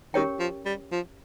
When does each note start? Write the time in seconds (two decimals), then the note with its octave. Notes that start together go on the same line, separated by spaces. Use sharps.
0.14 D#3 C#4 G4 A#4 C#5 G5
0.40 F3
0.65 G3
0.92 F3